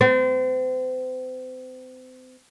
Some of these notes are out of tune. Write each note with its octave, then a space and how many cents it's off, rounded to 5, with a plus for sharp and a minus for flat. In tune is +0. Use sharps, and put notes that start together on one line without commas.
C4 -35